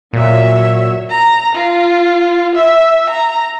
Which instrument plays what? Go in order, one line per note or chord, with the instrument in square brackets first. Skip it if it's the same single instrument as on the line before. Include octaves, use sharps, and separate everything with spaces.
[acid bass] A#2 [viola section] F#3 C#5 E5
[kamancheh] A#5
F4
E5
A#5